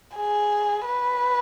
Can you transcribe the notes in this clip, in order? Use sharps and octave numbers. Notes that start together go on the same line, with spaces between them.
G#4
B4